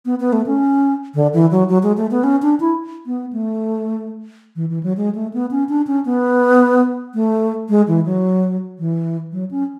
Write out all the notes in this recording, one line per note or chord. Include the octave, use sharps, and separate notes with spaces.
B3
B3
A3
C#4
D3
E3
F#3
F#3
G#3
A3
B3
C#4
D4
E4
B3
A3
E3
E3
F#3
G#3
A3
B3
C#4
D4
C#4
B3
A3
G#3
E3
F#3
E3
F#3
C#4